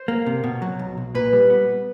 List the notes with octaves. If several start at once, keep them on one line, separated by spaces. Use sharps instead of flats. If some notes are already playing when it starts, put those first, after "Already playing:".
Already playing: C5
A#3
C3
B2
F#3
B1
B1
A#2 B4
G3
B3